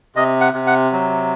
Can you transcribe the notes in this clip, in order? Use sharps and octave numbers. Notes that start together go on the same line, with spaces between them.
C3 D#5
F#5
C3
F#5
F#3